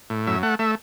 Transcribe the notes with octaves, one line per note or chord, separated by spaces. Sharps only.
A2
F#2 E5
A3 F#5
A3 E5